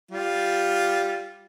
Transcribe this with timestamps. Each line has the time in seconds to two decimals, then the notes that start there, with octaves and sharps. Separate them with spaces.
0.11 G3 F4